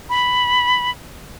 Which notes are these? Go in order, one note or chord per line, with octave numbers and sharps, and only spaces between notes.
B5